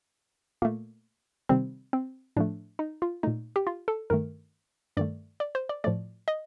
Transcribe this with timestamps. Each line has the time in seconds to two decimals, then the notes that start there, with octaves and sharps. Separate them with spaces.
0.62 A#2 A3 A#3
1.49 C3 D#3 G3 C4
1.93 C4
2.36 A2 F3 A3 D4
2.79 D#4
3.02 F4
3.23 A#2 A3 D#4
3.56 G4
3.67 F4
3.88 A4
4.10 G2 D#3 A3 A#4
4.97 G2 D#3 A3 D5
5.40 D5
5.55 C5
5.69 D5
5.84 A2 F3 A3 D5
6.28 D#5